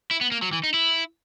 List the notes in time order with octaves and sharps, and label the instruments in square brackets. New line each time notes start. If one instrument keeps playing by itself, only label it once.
[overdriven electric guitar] E4
B3
A#3
F#3
E3
D#4
E4